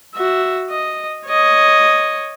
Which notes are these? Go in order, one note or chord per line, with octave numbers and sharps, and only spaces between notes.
F#4 E5
D#5
C#5 D#5